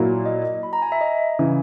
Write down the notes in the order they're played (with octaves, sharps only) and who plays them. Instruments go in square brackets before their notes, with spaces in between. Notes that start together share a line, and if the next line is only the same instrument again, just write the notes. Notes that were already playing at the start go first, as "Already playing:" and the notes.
Already playing: [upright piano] A#2 F#3 A#3 E4
[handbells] D#5
B5
A#5
G#5
E5
D#5
[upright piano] C#3 E3